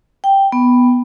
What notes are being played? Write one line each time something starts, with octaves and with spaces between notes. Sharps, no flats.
G5
B3